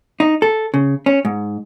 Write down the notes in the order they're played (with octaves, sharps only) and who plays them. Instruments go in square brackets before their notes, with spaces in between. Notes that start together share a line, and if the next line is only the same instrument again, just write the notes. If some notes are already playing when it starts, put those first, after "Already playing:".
[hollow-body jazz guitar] D#4
A4
C#3
C#4
G#2